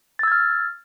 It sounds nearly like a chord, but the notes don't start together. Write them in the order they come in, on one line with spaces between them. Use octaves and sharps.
A6 E6 G#6 F6